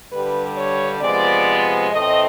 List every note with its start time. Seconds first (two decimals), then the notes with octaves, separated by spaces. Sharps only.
0.11 G2 D3 G3 B4
0.56 C#5
1.01 C3 F3 G#3 B3 D5
1.91 A2 E3 A3 C4 D#5